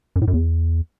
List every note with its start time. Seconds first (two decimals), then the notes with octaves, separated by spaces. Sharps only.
0.16 F#2
0.22 A2
0.28 F#2
0.33 E2